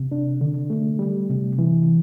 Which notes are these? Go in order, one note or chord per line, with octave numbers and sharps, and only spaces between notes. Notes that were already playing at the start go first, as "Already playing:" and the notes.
Already playing: C3
D4
D3
A3
G3
C3
E3